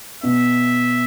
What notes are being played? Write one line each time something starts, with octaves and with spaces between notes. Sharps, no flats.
B2 E5